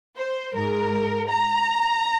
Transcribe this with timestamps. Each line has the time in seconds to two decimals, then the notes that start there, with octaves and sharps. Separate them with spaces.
0.17 C5
0.55 G#2 G#3 A#4
1.29 A#5